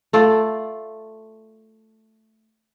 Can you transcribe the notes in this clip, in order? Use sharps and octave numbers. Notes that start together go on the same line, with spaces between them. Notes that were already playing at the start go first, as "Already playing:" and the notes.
A3 F4 A4 D5